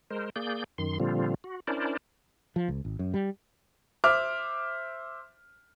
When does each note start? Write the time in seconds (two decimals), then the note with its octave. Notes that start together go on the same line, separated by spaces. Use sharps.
0.11 G#3 A#4 C5
0.36 A#3 G#4 D5 G6
0.78 F#2 D#3 C6
1.00 A#2 D3 F3 G3 C4 F4
1.44 F#4
1.67 C#4 D4 E4 A#4 C5 D5
2.56 F3
2.68 C#2
2.85 G#1
2.99 F#2
3.14 G3
4.04 C5 E5 D6 F6